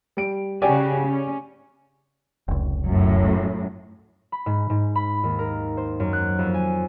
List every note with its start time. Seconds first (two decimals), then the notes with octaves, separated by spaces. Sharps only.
0.17 G3 D7
0.62 C#3 F#4 G4 D5 G#5
1.06 C#4
2.48 F1 C#2
2.90 F#2 A2
4.32 B5
4.46 G#2
4.70 G#2
4.95 B5
5.24 D#2
5.39 A#4
5.77 C5
6.00 F#2
6.13 F#6
6.39 F2
6.54 G#5